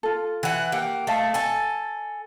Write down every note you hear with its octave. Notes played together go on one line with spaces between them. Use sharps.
F4 A4
E3 F#5
A#3 G4 F#5 G5
A3 D#5 F5 A5
A4 G#5